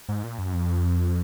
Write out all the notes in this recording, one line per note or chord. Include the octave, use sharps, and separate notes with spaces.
G#2
A#2
F#2
F2